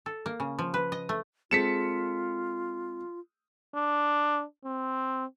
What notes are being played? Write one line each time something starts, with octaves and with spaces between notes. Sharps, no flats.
A4
A#3
C#3
F3
B4
D#5
A3
G#3 C4 F4 A4 B6 C#7 E7
D4
C4